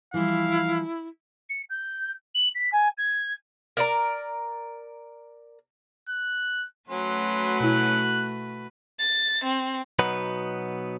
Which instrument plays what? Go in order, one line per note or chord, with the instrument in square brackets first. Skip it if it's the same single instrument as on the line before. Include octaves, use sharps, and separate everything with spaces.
[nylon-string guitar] E3 F3 G3 [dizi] E4 [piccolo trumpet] F5
[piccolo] C#7
G6
F#7
B6
G#5
G#6
[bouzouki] A#4 D5 A#5
[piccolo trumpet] F#6
[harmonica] F#3 C#4 [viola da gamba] A3 F#4 B4 [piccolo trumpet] C6
[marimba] B2 E4 [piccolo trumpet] F#6
[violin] A6
C4
[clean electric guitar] B2 F#3 B3 D#4 B4